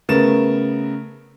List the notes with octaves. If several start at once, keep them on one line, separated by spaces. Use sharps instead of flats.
C#3 A3 B3 A#4 A6 E7